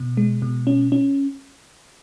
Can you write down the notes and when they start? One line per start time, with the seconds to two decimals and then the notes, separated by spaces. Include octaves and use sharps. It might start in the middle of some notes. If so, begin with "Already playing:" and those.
Already playing: B2
0.17 G#3
0.42 B2
0.67 C#4
0.92 C#4